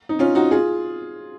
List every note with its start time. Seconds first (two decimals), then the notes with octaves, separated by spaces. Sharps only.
0.09 D#4
0.19 C#4 F4
0.35 D#4 F#4
0.51 F4 G#4